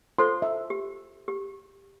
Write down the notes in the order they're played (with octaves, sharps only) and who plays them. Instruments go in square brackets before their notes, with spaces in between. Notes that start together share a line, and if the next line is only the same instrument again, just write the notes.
[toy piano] F4 A4 C5 [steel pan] C6
[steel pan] E5
[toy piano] G4
G4